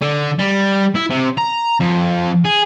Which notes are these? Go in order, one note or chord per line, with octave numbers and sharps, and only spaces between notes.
D3
G3
E4
C3
A#5
F2
G#4